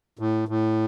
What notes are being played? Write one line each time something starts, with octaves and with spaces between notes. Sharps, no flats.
A2
A2